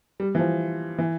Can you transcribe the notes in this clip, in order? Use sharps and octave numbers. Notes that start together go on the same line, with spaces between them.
G3
E3
F3
E3